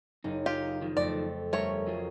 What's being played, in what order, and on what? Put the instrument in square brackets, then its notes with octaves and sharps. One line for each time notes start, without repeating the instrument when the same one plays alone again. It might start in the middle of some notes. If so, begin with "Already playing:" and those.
[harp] F#1 [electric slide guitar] D#4
[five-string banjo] F4 G4 F5
[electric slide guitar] D#3 F3
[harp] F2 A3 A#6 [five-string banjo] D5
[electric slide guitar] G2 [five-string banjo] A3 C#5 [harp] C#4 A#4
[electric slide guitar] F#3 F4 G#4